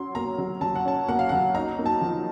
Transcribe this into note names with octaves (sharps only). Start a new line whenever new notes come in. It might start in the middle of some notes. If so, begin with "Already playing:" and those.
Already playing: F#3 C#4 C6
A#3 A#5
F#3
F#3 A5
F#5
C#4 A5
A#3 F#5
F5
F#5
F#3
D#4 A#5
A#3
A5
F3